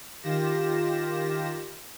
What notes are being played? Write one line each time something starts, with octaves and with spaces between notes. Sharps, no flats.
D#3 F4 G4 A#6 E7